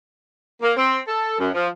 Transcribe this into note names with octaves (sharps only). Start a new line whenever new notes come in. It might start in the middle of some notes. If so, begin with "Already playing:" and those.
A#3
C4
A4
F#2
F3